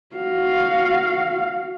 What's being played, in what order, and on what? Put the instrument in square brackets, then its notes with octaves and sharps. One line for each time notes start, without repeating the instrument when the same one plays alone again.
[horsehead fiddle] F#4 F5